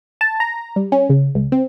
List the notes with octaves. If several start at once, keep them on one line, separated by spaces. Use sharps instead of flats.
A5
A#5
G3
C#4
C#3
C#2
C4